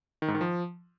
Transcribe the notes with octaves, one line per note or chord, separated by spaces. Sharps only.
D#3
G#2
D#3
F3